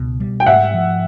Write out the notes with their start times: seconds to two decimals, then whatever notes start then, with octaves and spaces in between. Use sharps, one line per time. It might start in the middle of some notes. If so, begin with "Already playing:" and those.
Already playing: C#2 B2
0.20 G3
0.40 G5
0.46 G#2 E5 F#5
0.74 F3